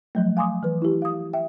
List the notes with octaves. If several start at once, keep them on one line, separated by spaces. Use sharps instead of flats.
F3 F#3 A3
F5 G#5 C6 D6 D#6
E3 B4
E4 G4
F5 D#6
E5 G5